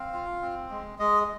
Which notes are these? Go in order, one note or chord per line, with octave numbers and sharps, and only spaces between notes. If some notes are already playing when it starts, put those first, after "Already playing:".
Already playing: C4 F5
F4
C4
G#3
G#3 D#5